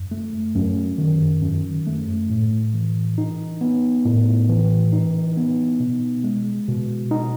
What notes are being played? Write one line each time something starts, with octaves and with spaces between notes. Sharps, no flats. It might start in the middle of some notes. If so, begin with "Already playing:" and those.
Already playing: F#2
A3
F#2
D#3
F#2
A3
A2
E3
D#4
B3
A2
E3
D#4
B3
B2
G#3
B2
D#4